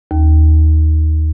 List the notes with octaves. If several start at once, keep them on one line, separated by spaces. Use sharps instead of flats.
D#2